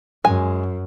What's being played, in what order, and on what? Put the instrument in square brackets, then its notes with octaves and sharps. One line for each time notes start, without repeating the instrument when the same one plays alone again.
[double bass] F#2 [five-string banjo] G#3 G#5